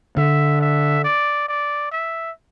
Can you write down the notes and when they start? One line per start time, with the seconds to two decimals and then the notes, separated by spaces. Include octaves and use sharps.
0.17 D3 E5
0.61 E5
1.04 D5
1.48 D5
1.92 E5